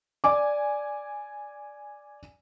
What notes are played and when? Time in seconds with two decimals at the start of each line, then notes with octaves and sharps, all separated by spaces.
0.24 D5 G#5 D6